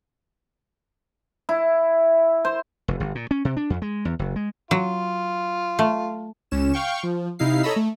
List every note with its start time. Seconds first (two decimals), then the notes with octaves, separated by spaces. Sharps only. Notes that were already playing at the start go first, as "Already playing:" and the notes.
1.49 E4
2.45 C5
2.88 F1
3.00 G1
3.15 A#2
3.31 C#4
3.45 C3
3.57 D4
3.70 F2
3.82 G#3
4.05 E2
4.19 F#1
4.36 G#3
4.71 F#3 F4
5.79 A3
6.51 C#2 C#4 E7
6.73 F5 G5 C#6
7.03 F3
7.39 C3 D#4 E4 F5 C7
7.63 A4 C#5 D#5 A#5 B5 E6
7.76 A3